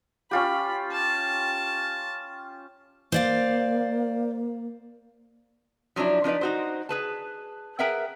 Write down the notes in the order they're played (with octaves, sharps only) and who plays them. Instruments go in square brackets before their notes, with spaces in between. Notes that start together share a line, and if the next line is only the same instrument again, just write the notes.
[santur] C#4 F4 G4 [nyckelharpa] B5
[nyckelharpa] A5
[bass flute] A#3 [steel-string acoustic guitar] C5 D5 F5
[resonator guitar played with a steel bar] F3 F#3 C#4 D4 E4
F3 D4 D#4 B4 D5
D#4 F#4 C5
G#4 B4 A5
G#4 A#4 B4 E5 F#5 G5